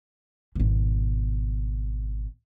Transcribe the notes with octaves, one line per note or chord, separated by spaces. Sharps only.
G#1 B2